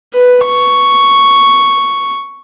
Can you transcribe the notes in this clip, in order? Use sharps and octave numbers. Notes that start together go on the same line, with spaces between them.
B4
C#6